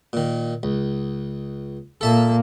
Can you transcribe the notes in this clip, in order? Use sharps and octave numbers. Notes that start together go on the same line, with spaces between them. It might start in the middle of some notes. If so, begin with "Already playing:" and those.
A#2 D#3
C#2
A#2 A#3 A4 E5 A5